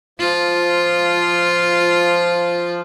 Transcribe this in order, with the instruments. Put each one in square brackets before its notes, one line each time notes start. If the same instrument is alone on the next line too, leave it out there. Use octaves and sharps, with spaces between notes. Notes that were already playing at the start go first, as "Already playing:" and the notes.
[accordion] F3 [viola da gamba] F4